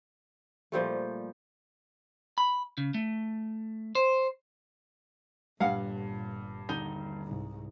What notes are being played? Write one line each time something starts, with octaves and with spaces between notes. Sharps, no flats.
A#2 F3 G3 A3
B5
C#3
A3
C5
G1 G2 A#2 F5 F#5
D#2 D3 G3 D#4
C2 G#2